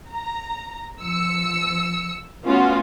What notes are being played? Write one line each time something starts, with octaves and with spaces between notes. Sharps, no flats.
A#5
F3 E6 C#7
A3 B3 C#4 F4 F#4